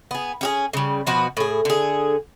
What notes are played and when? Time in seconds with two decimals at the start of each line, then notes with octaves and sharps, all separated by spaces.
0.11 B3 G#4
0.41 C#4 G4 G#4
0.73 C#3 G3
1.07 B2 F3 F#4 B4
1.37 A2 G#4
1.65 D3 G#4